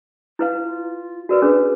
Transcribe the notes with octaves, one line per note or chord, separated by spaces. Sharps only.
E4 B4 F5
F4
F#4 A#4 B4 D5
C#4 D4 G#4 B4